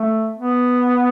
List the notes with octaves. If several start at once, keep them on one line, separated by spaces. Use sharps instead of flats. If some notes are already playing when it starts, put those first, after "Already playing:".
Already playing: A3
B3